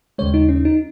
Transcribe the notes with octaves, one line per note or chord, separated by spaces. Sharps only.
D#2 C#3 G#3 C#5
D#4
C#4
D#4